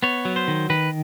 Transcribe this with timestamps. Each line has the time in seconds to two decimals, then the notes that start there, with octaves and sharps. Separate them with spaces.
0.03 B3 C#5
0.25 F#3
0.36 C5
0.48 D#3
0.70 D#3 B4